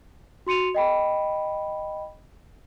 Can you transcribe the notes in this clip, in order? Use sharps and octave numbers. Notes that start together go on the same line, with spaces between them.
F#4 C6 C#7 D#7 F7
D#5 G5 B5